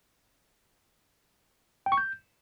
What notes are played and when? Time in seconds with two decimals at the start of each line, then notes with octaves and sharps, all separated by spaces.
1.86 G5
1.92 C#6
1.98 G6